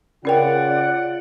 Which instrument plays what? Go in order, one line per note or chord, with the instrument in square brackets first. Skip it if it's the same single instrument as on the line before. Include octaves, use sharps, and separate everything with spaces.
[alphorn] C#3 [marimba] C#4 A#4 G5 [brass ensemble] F4 F#5 [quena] D5